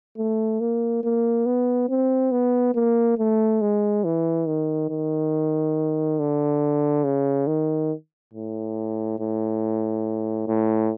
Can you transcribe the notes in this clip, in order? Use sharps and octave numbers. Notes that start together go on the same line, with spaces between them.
A3
A#3
A#3
B3
C4
B3
A#3
A3
G#3
E3
D#3
D#3
D3
C#3
D#3
A2
A2
A2